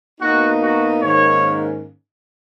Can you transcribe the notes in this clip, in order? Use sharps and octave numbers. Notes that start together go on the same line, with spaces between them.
B2 A#3 D#4 F#4
F#4
G#2 D#3 A#3 C#4 C#5